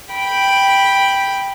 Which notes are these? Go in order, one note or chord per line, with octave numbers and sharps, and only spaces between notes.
G5 B5